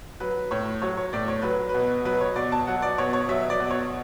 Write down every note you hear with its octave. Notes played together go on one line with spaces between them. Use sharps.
F#3 B4
A2 C#5
F#3 C#5
C#5
A2 D5
C#5
F#3 B4
B2 B4
F#3 B4
C#5
B2 D5
A5
F#3 F#5
D5
B2 C#5
C#5
F#3 E5
D5
B2
C#5